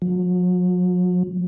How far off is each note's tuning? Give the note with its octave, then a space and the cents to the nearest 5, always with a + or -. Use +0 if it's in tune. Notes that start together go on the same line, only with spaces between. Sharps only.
F#3 -45